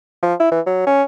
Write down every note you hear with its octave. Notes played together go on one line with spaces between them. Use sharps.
F3
E4
E3
F#3
C#4